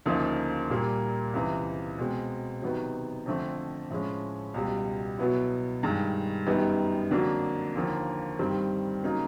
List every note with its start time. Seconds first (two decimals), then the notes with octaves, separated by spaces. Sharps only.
0.06 D2 C#3 F3 A#3 D#4
0.70 A#2 G3 A#3
1.33 C#2 C3 E3
1.98 B2 G#3 C4
2.62 C3 D#3 F#3 B3
3.26 F2 D3 F3 A3 C4
3.90 A2 F3 G#3 C#4
4.54 C#2 B2 G3
5.18 B2 F#3 B3 E4
5.83 G2 D#3 G#3
6.46 F#2 D#3 G3 B3 D#4
7.11 F2 D3 F#3 A#3 D4
7.75 D#2 D3 F3 A#3
8.39 G2 D#3 G3 C4
9.03 C#3 F#3 A#3 D#4